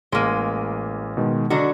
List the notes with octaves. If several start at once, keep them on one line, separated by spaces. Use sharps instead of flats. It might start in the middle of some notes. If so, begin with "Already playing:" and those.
A1 G#3 A#3 D#7
B2 D#3 G#3
D3 F#3 F#4 D#5